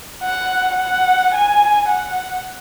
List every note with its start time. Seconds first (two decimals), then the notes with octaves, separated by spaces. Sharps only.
0.24 F#5
0.79 F#5
1.34 G#5
1.88 F#5